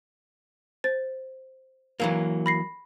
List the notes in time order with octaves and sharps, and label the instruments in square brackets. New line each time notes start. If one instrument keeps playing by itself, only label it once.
[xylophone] C5 A6
[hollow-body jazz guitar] E3 F#3 A#3
[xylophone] B5 A#6 C7